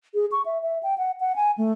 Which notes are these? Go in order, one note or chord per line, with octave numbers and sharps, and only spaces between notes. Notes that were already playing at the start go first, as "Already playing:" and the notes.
G#4
C#6
E5
E5
G5
F#5
F#5
G#5
A3